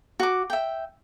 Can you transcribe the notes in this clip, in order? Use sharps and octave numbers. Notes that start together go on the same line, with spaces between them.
F#4 D6
E5 G5